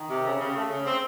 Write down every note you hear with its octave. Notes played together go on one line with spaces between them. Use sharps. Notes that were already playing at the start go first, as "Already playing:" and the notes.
Already playing: D#3
C3
C#3
C#3
A3
C#3
C4